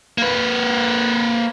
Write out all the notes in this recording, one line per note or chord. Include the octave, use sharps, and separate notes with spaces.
A#3 B4